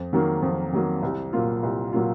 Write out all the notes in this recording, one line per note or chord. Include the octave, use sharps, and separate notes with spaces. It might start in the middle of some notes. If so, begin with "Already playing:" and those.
Already playing: F2
D#3 F#3 A#3
F2
D#3 F#3 A#3
C2
A#2 F#3 A#3 F4
C2
A#2 F#3 A#3 F4